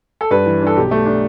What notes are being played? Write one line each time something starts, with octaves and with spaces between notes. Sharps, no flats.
A4
G2 B4
E3
D4 A4
B1 G4
A3
D4